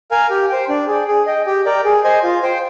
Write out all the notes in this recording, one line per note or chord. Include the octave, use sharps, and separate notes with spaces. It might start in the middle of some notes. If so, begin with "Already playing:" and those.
A#4 F5 G#5
G4
C5 G5
D4
G#4 D5 G5
G#4
D#5 G5
G4
A#4 D5 G5
G#4
C5 D#5 G#5
F4
C5 G5